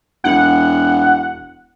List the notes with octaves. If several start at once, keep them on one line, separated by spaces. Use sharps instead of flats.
E1 F#5